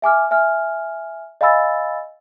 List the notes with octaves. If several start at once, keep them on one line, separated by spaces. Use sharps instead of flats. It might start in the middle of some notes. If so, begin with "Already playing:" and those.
E5 G#5 D6 F6
E5 G#5 F6
D#5 F5 G#5 B5 E6 A6